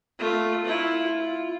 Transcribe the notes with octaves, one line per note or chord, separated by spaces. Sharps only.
A3 F4
E4 F4
F4